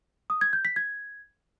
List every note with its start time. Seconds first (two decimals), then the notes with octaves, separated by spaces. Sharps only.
0.30 D#6
0.41 G#6
0.53 G6
0.65 B6
0.76 G#6